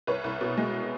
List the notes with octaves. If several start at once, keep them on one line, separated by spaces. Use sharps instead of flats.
C2 B4 C#5
C2
B2
G#3